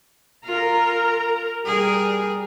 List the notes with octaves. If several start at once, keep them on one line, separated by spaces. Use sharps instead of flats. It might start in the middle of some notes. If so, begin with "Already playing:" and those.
F4 A#4 A#5
G3 G#4 A#4